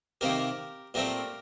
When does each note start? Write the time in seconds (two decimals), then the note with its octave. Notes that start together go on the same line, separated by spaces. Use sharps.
0.21 C3 D#3 A#3 G4 A#4
0.94 A#2 A3 C4 G4 A#4